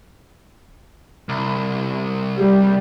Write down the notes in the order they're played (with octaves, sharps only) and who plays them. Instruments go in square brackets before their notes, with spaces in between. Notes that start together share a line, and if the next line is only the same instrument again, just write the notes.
[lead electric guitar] C2
[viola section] G3